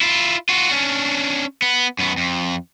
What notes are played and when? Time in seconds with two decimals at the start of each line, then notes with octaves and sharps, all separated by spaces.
0.01 E4 F4
0.49 F4 F#4
0.71 C#4 D4
1.62 B3
1.99 F#2 B3
2.17 F2